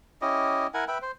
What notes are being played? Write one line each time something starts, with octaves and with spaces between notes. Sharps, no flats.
C#4 E4 G4 D#5
E4 A#4 F#5 G#5
B4 E5 G5 B5
C5